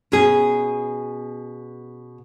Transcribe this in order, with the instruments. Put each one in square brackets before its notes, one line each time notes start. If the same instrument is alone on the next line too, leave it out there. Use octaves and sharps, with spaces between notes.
[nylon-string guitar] B2 C#4 G#4